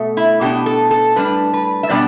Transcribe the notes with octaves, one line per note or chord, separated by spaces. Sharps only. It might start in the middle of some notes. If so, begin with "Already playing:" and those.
Already playing: B2 A3
E4
B2 B3 D4 G4
A4
A4
A2 G3 D4 B4
B4
E5
B2 G3 B3 D4 D5